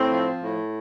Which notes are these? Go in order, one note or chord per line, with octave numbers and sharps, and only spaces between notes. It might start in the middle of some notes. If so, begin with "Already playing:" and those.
Already playing: A2 C4
F3
A2